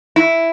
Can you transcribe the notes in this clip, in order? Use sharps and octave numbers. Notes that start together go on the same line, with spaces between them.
E4